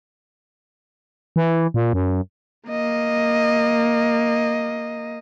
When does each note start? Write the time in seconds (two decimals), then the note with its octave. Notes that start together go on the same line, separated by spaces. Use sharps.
1.36 E3
1.74 A#2
1.93 F#2
2.68 A#3 D#5